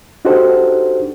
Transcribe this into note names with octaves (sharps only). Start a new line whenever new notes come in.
D4 D#4 F#4 G4 A4 C5